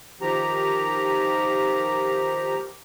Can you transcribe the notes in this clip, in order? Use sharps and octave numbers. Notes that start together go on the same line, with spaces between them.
D#3 F3 G4 A#5